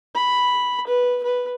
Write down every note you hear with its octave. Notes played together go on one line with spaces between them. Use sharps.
B5
B4
B4